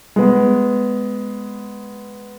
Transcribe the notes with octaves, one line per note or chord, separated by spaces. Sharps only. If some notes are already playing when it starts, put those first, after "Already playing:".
G#3 B3